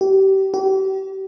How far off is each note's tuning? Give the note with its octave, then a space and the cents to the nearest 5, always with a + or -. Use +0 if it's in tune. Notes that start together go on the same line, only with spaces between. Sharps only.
G4 -25
G4 -35